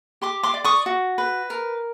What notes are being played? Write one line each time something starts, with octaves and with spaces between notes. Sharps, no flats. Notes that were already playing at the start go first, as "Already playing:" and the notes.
G4 C6 D6
C6 D6
D5
C#6 D#6
F#4
B4
A#4